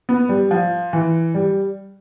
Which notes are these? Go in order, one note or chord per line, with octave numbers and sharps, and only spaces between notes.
B3
G3
F3
E3
G3